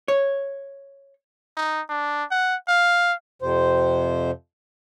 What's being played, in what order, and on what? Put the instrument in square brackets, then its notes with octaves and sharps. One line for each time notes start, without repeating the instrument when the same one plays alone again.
[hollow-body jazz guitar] C#5
[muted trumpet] D#4
D4
F#5
F5
[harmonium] F2 C3 C5